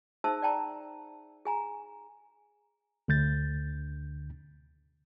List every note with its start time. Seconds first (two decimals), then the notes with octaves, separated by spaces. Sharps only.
0.24 D#4 G#4 C5 E5 A5 E6
0.42 D5 G5 A5 A#5
1.45 G#4 G#5 A#5
3.08 D2 D3 G6 A6